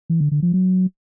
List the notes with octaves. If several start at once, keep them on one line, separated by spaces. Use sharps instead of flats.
E3
D3
D3
F3
F#3